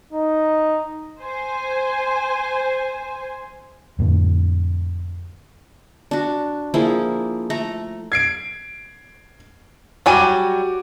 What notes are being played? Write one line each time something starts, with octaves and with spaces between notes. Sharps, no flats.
D#4
C5 G#5
F2 A2 D3
D4 F#4
F3 A#3 E4 G#4
A3 A#5
G#6 C7 D7
F#3 G3 F#4 G#5 D6 D#7